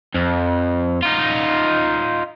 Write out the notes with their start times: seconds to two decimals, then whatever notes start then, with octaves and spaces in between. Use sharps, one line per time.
0.15 F2
1.03 D#4 F4